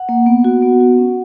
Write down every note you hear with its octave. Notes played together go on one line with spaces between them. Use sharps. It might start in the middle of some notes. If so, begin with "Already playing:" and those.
Already playing: F#5
A#3
B3
F#4
B3
F#4
C#4